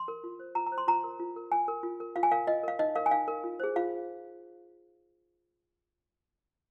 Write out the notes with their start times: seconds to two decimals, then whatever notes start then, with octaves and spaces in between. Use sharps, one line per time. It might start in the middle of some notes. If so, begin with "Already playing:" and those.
Already playing: C6
0.08 A#4
0.24 F4
0.39 C5
0.55 F4 A#5
0.66 A#5
0.72 C5
0.78 C6
0.87 F4 A#5
1.04 A#4
1.20 F4
1.36 A#4
1.52 F4 G#5
1.68 A#4
1.83 F4
2.00 A#4
2.16 F4 F5
2.23 G#5
2.32 A#4 F5
2.47 F4 D#5
2.63 A#4 F5
2.79 D#4 D#5
2.96 A#4 F5
3.06 G#5
3.11 D#4 F5
3.28 A#4
3.44 F4
3.60 G#4 C5
3.76 F4 F5